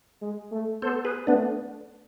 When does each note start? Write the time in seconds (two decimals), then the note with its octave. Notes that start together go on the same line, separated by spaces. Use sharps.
0.22 G#3
0.52 A3
0.82 B3 A4 C5
1.04 G#4 B4
1.27 A3 B3 D4